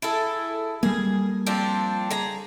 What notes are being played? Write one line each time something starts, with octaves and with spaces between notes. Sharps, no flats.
E4 G#4 A4
G3 A#3 G#4
F3 C4 D4
G#4 A#5